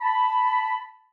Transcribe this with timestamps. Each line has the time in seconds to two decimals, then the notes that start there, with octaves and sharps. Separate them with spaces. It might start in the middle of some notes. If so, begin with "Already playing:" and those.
0.02 A5 B5